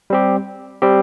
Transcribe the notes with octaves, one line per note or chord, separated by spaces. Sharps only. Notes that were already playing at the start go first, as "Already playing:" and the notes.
G3 C4 G4
G3 C4 G4